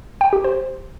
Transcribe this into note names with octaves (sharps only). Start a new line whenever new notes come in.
G5
G4
C5